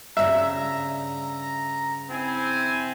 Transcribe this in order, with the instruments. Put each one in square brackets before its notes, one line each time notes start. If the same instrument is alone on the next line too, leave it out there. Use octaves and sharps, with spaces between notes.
[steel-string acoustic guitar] G2 A#2 C#3 [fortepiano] E5 [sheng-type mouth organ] A#5
[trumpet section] C4 E4 G#5